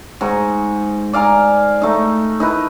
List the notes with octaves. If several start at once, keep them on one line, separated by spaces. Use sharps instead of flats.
G#2 A#5 C#6
D5 F5 G#5 A#5
A3 D#4
D#4 E4 B4